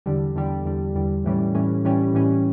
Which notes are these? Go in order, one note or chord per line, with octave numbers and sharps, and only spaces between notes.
E2 D3 G3
E2 D3 G3
E2 D3 G3
E2 D3 G3
A2 E3 G3 C#4
A2 E3 G3 C#4
A2 E3 G3 C#4
A2 E3 G3 C#4